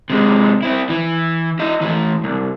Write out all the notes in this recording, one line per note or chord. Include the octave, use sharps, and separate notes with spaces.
C3 G#3
C4 E4
E3
E4 D#5
E3 A3
C2